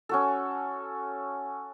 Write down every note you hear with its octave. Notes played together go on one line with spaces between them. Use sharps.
C#4 F#4 A4